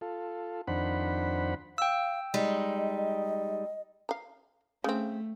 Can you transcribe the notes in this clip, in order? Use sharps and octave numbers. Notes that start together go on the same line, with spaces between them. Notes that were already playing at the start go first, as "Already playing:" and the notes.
F4 A4
F2 D#3 D4 C5 F#5 B5
F5 G5 E6
G3 G#3 D#4 D#5
F5 A#5
C#3 A3 C4